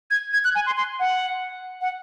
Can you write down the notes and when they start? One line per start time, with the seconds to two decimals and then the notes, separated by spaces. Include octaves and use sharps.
0.11 G#6
0.33 G#6
0.44 F#6
0.55 G#5
0.66 C6
0.77 C6
1.00 F#5
1.81 F#5